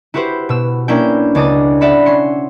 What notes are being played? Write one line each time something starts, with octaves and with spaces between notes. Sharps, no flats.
E4 F#4 G4 B4 C5
B2 E6
A#3 C#4 D4 E4 G5
C#2 D4 D6 D#6 A6
D5 E5 F#5 B5
C#4 C6 C#7